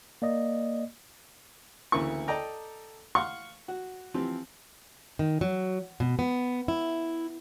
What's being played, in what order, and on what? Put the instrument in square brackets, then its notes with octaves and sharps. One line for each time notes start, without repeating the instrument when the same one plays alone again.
[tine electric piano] A#3 D5 D#5
[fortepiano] A1 D2 C#3 A#3 E4 C#6
A4 D5 D#5 G5 A#5 D6
F5 F#5 C6 C#6
F#4
E3 F3 C4 G4
[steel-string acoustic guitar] D#3
F#3
B2
B3
E4